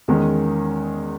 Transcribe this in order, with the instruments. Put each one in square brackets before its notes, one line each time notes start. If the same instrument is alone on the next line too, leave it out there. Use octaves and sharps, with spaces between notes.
[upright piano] E2 D#3 G#3 C#4